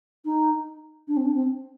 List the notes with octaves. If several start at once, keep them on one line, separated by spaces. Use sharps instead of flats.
D#4
D4
C4
D4
C4